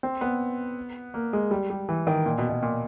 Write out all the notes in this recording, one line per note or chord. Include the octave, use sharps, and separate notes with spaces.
C4
B3
A#3
G#3
G3
G3
E3
D#3
A#2
B2
B2
A#2